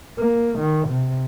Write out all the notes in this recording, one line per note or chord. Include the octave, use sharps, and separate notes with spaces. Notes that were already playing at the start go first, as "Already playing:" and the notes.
A#3
D#3
C3